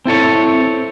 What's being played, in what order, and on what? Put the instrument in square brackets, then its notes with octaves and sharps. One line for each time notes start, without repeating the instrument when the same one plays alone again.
[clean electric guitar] C4 E4 A4 C#5